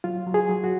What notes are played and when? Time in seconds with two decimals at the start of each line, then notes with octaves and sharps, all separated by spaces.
0.04 F#3 F4
0.26 F#3
0.34 G#4
0.49 F#3
0.64 F#4